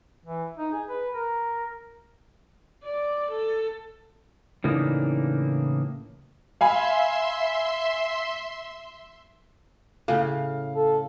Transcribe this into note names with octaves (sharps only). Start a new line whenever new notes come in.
E3
D#4
G#4
B4
A#4
D5
A4
A2 C#3 E3 A#3 D4 D#4
E5 F5 G#5 B5 C6
A2 C#3 F5
A4